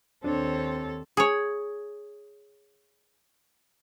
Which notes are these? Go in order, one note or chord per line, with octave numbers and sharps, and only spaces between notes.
D#2 C4 D4 A4 C5 C#5
G#4 C#5